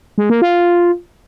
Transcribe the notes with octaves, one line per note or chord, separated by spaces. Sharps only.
G#3
A#3
F4